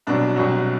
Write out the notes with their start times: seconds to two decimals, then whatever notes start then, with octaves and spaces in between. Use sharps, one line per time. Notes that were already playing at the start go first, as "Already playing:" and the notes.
0.07 C2 B2 F#3 D4
0.36 C2 B2 F#3